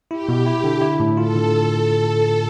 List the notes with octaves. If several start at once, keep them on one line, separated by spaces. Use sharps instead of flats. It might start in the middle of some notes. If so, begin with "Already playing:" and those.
E4 G4
B2
E4
D3
E4
A2
F4 A4
D3